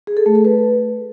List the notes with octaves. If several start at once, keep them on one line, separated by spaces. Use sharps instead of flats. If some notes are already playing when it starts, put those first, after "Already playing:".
G#4
A4
A3
A4
B4